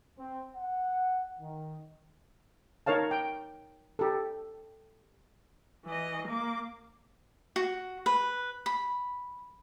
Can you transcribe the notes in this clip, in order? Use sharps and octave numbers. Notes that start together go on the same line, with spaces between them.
C4
F#5
D#3
D#4 A#4 C#5 F5 A5
G5
G4 A4
E3 D#5
A#3 D6
F#4
B4
B5